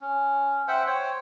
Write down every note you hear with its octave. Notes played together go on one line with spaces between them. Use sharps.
C#4
C5 E5 F#5 G5
C5 C#5 G5